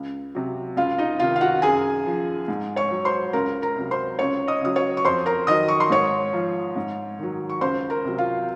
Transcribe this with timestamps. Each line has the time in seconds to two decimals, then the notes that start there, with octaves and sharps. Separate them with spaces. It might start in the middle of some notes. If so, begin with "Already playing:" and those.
Already playing: C#2
0.35 C3 F#3
0.77 C#2 F4 F5
0.98 D#4 D#5
1.19 C3 D#3 F4 F5
1.36 F5
1.41 F#4 F#5
1.62 F#2 G#4 G#5
2.06 F3
2.48 G#2
2.76 C#5 C#6
2.91 F#3
3.05 C5 C6
3.33 C#2 A#4 A#5
3.62 A#4 A#5
3.76 C3 F#3
3.91 C5 C6
4.19 C#2 C#5 C#6
4.48 D#5 D#6
4.61 C#3 F#3 D#6
4.76 C#5 C#6
4.97 C#6
5.04 F2 C5 C6
5.26 A#4 A#5
5.47 D#3 F#3 D#5 D#6
5.68 C#6
5.80 C6
5.90 G#2 C#5 C#6
6.33 F3
6.76 G#2
7.19 D#3 F#3
7.49 C#6
7.61 C#2 C5 C6
7.90 A#4 A#5
8.05 C3 F#3
8.18 F4 F5